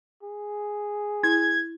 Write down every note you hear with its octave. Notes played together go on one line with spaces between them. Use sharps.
G#4
E4 G#6